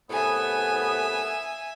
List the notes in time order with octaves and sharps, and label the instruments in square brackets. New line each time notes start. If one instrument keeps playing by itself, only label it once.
[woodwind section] C2 A2 B3 [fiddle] E5 G#5